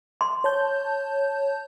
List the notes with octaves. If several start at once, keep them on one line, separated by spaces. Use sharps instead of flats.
C6
C#5 A5 G6